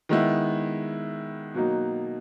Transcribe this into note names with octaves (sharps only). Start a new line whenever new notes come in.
D#3 G#3 B3 E4
B2 F#3 A#3 D#4